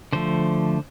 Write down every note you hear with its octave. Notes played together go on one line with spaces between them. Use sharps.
D3 F3 A3 C5